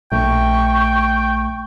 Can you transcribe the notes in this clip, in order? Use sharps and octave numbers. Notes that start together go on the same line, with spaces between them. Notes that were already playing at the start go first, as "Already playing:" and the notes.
A#1 A3 G5 C#6